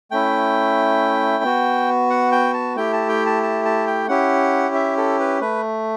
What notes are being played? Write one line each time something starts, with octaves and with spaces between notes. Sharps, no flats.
A3 C#4 E4 G5
B3 F#4
F#5
G5
A5
A3 E4 G4 G5
A5
G5
A5
A5
A5
G5
C#4 E4 G4 F#5
E5
A4
B4
A3 B4